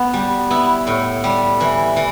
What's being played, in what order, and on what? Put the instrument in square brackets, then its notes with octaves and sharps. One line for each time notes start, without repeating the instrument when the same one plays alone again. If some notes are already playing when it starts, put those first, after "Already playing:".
Already playing: [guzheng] B3
G3
B3 E4
A2
G3
E3
E3